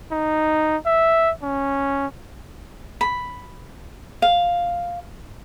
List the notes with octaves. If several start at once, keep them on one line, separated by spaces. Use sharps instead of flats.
D#4
E5
C#4
B5
F5